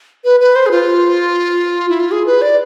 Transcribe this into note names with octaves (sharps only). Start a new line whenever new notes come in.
B4
B4
C5
G#4
F4
E4
F4
G#4
B4
D5